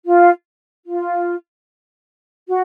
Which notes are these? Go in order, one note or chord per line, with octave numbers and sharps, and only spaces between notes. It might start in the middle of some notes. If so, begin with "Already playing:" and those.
F4
F4
F#4